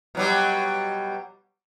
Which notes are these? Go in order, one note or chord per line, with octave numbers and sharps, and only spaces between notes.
B2 F#3 G3